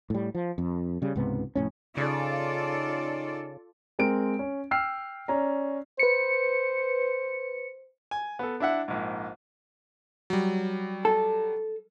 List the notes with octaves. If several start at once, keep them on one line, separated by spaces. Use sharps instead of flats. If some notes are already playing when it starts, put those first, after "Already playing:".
A2 G3
F3
F2
C#3 G3
C#2 G#2 C3 B3
F1 A2 C#4
C#3 C#4 D#4 F4 A4 D5
G#3 C4 A#4 D7
C#4
G5 E6 F6 C7
C#4 D5 A#5
B4 C5 C#7
G#5
B3 A4
D4 E4 E5 F#5
A#1 G#2
F#3 G3
A4